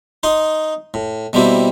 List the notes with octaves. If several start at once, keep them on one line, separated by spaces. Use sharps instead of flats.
D#4 D#5 C6
A2
B2 G3 A#3 C4 E4